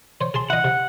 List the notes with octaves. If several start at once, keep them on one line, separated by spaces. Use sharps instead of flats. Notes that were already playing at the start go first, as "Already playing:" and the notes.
C5 C#5
G#4 A5 C6
E4 D#5 F#5
C3